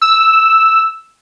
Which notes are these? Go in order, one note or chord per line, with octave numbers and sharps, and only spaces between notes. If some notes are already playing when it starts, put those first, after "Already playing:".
E6